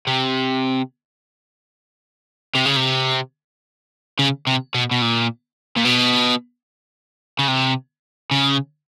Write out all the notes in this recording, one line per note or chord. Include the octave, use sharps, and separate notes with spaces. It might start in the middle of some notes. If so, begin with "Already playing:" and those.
C3
C3
C#3
C3
C#3
C3
B2
B2
A#2
A#2
B2
C#3
C3
C#3